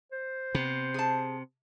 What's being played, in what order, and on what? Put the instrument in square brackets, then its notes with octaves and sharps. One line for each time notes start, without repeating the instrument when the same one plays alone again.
[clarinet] C5
[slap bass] C3 [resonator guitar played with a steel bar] B3
[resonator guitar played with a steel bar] G#4 A5